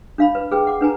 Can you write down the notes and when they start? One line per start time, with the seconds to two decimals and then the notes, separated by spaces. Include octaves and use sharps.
0.18 D4 F5 B5
0.35 B4
0.51 G#4 B4 G5
0.67 F#5 D6
0.81 D4 B4 G#5 A#5